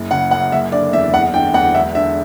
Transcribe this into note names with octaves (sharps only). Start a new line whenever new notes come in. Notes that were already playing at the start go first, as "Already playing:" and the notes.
Already playing: F#1
C#3 F#5
F#2 F#5
F#1 E5
D3 D5
E2 E5
F#1 F#5
D3 G5
E2 F#5
E1 E5
D3 E5